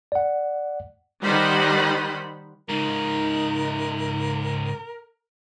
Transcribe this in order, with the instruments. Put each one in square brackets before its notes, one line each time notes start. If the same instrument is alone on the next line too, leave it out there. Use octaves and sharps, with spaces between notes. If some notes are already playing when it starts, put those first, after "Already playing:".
[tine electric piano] D5 F#5
[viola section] D#3 G3 D#4 C5 F#5 B5
[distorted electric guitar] G#2 C#3 [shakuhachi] D#4 [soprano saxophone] A#4